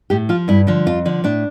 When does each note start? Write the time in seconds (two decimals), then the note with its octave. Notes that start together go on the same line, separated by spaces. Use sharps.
0.10 A2 G4
0.29 F3 F4
0.48 G2 E4
0.67 D3 F3
0.86 F2 F4
1.05 D3 F3
1.24 A2 D4